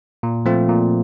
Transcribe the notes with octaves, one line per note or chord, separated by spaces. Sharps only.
A#2
F3 A3 C4 F4
A#2